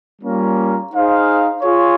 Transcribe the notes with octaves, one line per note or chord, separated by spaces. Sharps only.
G3 A#3 C#4 F4 A#4
D#4 G#4 C5 F5
F4 G#4 C#5 F5